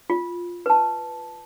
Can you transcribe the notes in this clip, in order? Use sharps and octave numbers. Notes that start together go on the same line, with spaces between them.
F4
B4 A5